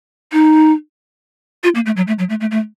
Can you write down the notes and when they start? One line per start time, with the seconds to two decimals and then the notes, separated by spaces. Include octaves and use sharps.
0.32 D#4
1.64 F4
1.75 A#3
1.86 A3
1.97 F#3
2.07 A3
2.19 F#3
2.29 A3
2.40 A3
2.51 A3